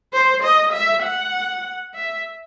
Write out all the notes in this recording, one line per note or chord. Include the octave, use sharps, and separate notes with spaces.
C5
D#5
E5
F#5
E5